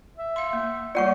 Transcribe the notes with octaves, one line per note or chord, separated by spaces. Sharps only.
E5
F5 C6
A#3
G3 A#3 F4 D5 F#5 C#6